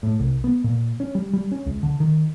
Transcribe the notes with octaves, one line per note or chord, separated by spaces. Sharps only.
A2
C2
B3
A#2
C#4
G3
G3
C#4
C#2
D3
D#3